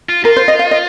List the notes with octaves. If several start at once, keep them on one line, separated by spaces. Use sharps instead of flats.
F4
F4 A#4
C5
D#5
F5
D#5